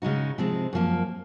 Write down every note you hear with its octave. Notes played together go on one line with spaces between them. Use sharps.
C#3 G#3 D#4 F#4
C3 F3 G#3 C4
F#2 F3 A#3